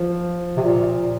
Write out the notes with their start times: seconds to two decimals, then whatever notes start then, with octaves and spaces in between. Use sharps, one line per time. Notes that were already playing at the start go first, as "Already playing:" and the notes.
Already playing: F3
0.57 C3
0.62 A#2